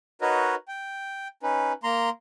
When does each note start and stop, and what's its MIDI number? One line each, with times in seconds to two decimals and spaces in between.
0.21 0.55 63
0.21 0.55 66
0.21 0.55 70
0.21 0.55 71
0.21 0.55 73
0.21 0.55 75
0.68 1.28 79
1.43 1.73 61
1.43 1.73 63
1.43 1.73 71
1.83 2.09 58
1.83 2.09 82
1.83 2.09 84